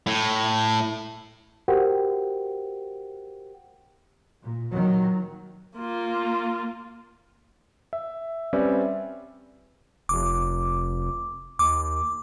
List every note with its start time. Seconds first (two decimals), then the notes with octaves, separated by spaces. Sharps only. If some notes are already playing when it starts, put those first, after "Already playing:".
0.07 A2
1.68 F#4 G4 A#4 C5 F#5 G5
4.41 A#2
4.72 A#2 D#3 F#3
5.76 A#3 F4
7.93 E5
8.53 G3 C4 C#4 B4 D5 E5
10.09 F1 D6
11.59 D#2 D6